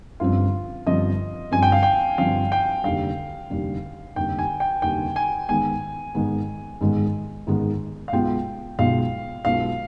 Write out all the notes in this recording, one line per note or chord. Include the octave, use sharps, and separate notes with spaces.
G1 G2 F3 C4 F4
G1 G2 F3 C4 D#5
G1 G2 F3 C4 G#5
G5
F5
G5
G1 G2 F3 C4 F5
G5
F1 D#2 D3 G3 F5
F1 D#2 D3 G3
F1 D#2 D3 G3 G5
G#5
G5
F1 D#2 D3 G3 G5
G#5
G#1 G#2 D#3 G#3 B3 G#5
G#1 G#2 D#3 G#3 B3
G#1 G#2 D#3 G#3 B3
G#1 G#2 D#3 G#3 B3
F5
B1 B2 G#3 B3 F4 G5
B1 B2 G#3 B3 F4 F5
B1 B2 G#3 B3 F4 F5